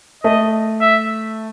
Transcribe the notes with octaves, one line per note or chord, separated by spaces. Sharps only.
A3 D#5
E5